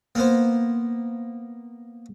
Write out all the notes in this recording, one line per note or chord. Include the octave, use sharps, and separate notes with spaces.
A#3 B3 C5